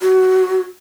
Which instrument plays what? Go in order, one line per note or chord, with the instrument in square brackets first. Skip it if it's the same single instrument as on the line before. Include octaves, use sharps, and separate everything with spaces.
[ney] F#4